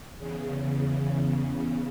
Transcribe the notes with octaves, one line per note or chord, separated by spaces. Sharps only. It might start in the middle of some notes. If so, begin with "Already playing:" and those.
E2 C#3